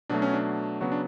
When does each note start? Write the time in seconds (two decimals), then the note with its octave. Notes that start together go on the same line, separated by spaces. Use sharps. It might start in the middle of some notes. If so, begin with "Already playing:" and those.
0.10 B2 F#3 A3 D4
0.22 C#4
0.34 D4
0.81 C#3 F#3 B3 F#4
0.92 D4